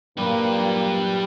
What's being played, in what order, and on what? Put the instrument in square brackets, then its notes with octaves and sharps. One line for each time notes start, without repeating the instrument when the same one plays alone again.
[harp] G2 F#3 D5 [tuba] A#2 [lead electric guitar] G3 B4 [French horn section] A#3